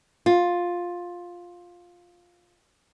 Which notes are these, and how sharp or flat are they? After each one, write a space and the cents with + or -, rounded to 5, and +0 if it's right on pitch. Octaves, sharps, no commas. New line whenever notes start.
F4 +10